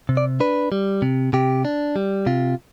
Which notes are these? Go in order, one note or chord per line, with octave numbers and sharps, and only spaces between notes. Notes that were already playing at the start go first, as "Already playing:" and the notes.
C3
D5
D4 B4
G3
C3
C3 G4
D4
G3
C3 F4